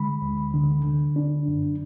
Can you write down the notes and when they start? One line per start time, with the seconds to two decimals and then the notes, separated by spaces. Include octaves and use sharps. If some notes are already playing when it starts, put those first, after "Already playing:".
Already playing: D3 G#3 B5
0.22 D2
0.54 D3
0.85 D3
1.16 D4
1.48 F#2